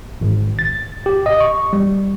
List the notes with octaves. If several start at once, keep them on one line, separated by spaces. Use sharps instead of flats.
G#1
A6
G4
D#5
C#6
G3